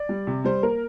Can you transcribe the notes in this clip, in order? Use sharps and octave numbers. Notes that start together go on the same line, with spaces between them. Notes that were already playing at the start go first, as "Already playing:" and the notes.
Already playing: D5
G3
C3
G3 C5
A#3 A#4